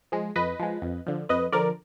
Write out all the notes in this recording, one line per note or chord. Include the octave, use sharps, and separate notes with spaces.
F3 G#3
F2 B4 D#5
F3 G#3
F2
D3 F3
F2 B4 D#5
D3 F3 A#4 D5